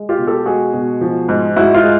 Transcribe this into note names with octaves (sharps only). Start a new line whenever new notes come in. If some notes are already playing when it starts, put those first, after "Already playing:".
Already playing: G#3
F4 G4
B2
G4 A4
G#3 F#4 G#4
B2
F3
G#2
G#2 E4 F#4
D#4 F4
G#3